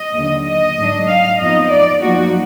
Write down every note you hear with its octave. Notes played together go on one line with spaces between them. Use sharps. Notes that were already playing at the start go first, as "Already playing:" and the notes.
Already playing: D#5
D#2 D3 F#3
D#5
G#2 F#3 D4
F5
F2 F3 B3 D#4 D#5
D5
F#2 F3 A#3 D#4 F#4